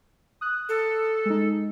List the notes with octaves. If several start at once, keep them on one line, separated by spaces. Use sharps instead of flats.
D#6 F#6
A4
G#3 D#4